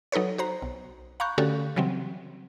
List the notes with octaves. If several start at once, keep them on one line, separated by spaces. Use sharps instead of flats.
F#3 D#4 A4 B4 C#5
F#4 C5 A#5
B1
F5 A#5 B5 C#6 F#6 G6
D3 A3 C#4 F#4 G4 A4
C#3 E3 F#3 G3 C4